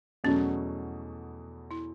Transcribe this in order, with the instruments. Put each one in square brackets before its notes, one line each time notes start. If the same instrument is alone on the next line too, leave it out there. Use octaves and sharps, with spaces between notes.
[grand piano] E2 B2 F#3 A3 [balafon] C#4
[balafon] E4